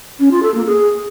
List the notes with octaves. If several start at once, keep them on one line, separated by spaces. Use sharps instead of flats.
C#4
F4
A4
A#3
G#4